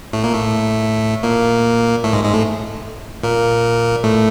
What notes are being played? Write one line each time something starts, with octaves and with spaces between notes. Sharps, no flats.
A2 A3
A#2 A#3
A2 A3
A#2 A#3
A2 A3
G#2 G#3
G#2 G#3
A2 A3
A#2 A#3
A2 A3